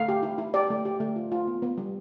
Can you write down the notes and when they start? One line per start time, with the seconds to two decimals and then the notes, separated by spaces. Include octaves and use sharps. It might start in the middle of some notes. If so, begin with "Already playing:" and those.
Already playing: A3 F5
0.08 G4
0.23 E4
0.38 E4
0.54 G4 D5
0.70 A3
0.85 G4
1.00 A3
1.16 F4
1.32 F4
1.47 B3
1.62 B3
1.78 G3